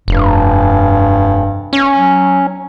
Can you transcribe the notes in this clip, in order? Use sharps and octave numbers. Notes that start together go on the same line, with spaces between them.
F1 G2
C#4
F#3